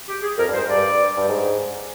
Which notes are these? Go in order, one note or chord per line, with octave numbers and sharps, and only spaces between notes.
G4
G#4
F2 A#4
G2
C5
G#2
G2 D5
G2
G#2